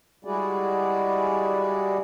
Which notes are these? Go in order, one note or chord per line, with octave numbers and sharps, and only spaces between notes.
G3 G#3 E4 F#4 G#4 D5